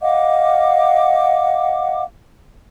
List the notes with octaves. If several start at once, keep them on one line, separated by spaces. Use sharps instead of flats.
D#5 F5 F#5 D6